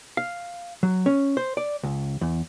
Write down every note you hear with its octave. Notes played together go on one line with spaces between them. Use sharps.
F5
F#3
C#4
C5
D5
C#2
E2